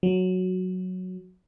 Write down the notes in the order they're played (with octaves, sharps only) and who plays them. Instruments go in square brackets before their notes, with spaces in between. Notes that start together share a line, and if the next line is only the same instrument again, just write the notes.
[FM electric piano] F#3